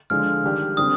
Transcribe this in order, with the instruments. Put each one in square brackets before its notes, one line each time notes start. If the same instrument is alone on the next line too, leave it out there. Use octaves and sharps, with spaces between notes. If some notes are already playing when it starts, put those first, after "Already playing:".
[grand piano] D3 F3 G#3 [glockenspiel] F6
[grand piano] D#3 G3 D4 G4
[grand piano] D3 G3 C4 [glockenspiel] D#6